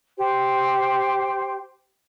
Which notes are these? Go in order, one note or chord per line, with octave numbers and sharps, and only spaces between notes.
G4 C5